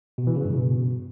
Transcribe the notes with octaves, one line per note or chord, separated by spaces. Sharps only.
B2
E3
C#3
G2
B2